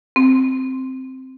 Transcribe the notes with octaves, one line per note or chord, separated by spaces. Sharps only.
C4